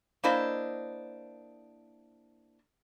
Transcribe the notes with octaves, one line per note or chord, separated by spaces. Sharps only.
A#3 D4 E4 C5 D#5